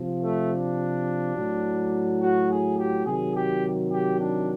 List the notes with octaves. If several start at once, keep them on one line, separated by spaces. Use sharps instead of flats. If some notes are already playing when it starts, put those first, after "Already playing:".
Already playing: C3 F3
A3
D4
A2 F#3
F#4
G#4
G4
C3 D#3 F#3 G#4
G4
G4
D4